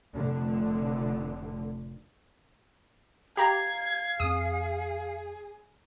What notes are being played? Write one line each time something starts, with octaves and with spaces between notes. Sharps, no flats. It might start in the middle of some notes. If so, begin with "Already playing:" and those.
F1 A2 D3
G4 F5 A#5 G#6
F2 C4 G#4 D#6